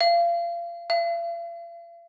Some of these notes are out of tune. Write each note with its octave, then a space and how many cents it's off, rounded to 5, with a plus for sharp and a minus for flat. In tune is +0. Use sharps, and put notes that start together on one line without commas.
F5 -30
F5 -45